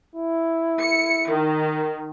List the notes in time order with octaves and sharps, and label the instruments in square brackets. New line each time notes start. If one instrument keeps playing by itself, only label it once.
[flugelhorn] E4
[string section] C#7
D#3